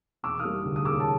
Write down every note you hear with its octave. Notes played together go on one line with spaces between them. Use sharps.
E1 D6 E6
G3 D#6 F6
D2
D#6
E1 D6 E6
A5